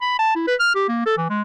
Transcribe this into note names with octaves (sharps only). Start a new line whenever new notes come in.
B5
A5
E4
B4
F6
G4
A#3
A4
E3
G#3